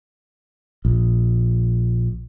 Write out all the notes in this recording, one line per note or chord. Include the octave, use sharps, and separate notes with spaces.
A#1